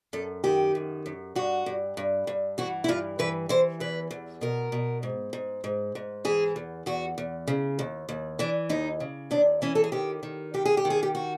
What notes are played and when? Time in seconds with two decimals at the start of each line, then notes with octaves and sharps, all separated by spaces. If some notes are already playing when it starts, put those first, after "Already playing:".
0.13 F#2 A4
0.44 D#3 G4
0.75 F#2
1.06 F#2
1.35 G2 F#4
1.66 G2
1.97 G2
2.27 G2
2.58 E3 F#4
2.84 E4
2.88 G2 F4
3.19 E3 B4
3.49 E3 C5
3.80 E2 B4
4.11 E2
4.41 B2 A#4
4.72 B2
5.03 G#2
5.33 G#2
5.64 G#2
5.95 G#2
6.25 E3 G#4
6.56 E2
6.86 E2 F#4
7.18 E2
7.48 C#3
7.79 D#2
8.09 D#2
8.39 E3 D4
8.69 D#2 D#4
9.00 C#3
9.31 D#2 D4
9.62 E3 C#4
9.75 A4
9.84 G#4
9.92 D#3 G4
10.23 D#3
10.54 G2 G4
10.65 G#4
10.77 G4
10.85 D#3
10.90 G#4
11.03 G4
11.15 F#4